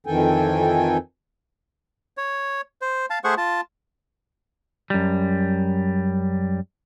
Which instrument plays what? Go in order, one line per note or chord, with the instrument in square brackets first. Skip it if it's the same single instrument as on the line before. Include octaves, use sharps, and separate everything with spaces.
[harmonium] F2 D#3 E3 A4 G5 G#5
[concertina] C#5
C5
F5 A5
A3 G#4 C5 F#5 C#6
F4 A5
[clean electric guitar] F#2 G3